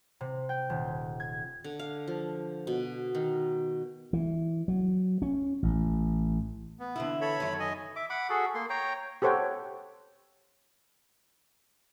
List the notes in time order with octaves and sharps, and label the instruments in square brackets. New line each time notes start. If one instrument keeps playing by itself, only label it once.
[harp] C3
G5
D#1
G#6
[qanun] D3
F5
F3
B2
D#3
[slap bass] E3
F#3
C#4
A1
[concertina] B3
[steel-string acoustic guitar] D3 E3 E4
[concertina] A4 C#5 B5
[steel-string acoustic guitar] F#2 D#3
[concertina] D#5 G#5
[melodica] E5 D6
F#5 B5 D6
F#4 G#4 A4
A#3 C6
C#5 G5 A#5
[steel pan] G4 A4 C5 C#5 F#5 G5